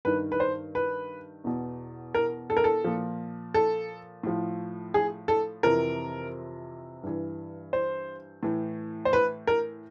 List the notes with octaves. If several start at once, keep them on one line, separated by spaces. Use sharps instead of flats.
G2 D#3 B4
B4
C5
B4
E2 B2
A#4
A4
A#4
A4
A#2 F3
A4
A2 F3
G#4
A4
F2 C3 E3 A#4
G2 E3
C5
A2 E3
C5
B4
A#4